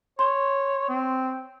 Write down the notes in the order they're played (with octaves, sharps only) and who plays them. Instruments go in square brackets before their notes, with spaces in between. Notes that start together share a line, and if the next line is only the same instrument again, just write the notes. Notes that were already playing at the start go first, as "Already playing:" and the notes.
[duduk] C#5 [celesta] C6
[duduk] C4